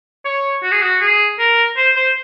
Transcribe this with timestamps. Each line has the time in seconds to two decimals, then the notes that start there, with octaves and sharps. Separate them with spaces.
0.25 C#5
0.63 F#4
0.72 G#4
0.81 F#4
1.01 G#4
1.39 A#4
1.77 C5
1.96 C5